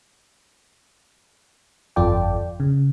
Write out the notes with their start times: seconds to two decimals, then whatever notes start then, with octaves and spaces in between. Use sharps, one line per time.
1.96 G1 F2 F4 A4 D5 G5
2.60 C#3